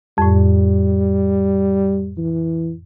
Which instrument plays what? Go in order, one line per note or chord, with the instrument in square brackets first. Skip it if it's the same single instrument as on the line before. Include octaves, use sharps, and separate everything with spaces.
[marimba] F2 A2 [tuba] G3
[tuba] E3